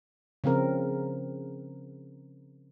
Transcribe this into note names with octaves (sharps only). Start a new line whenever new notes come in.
C#3 F3 C4 A#4